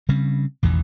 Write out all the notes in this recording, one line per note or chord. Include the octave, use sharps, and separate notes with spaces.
C#3 G3 C4 C#4
A1 E2 B2 D#3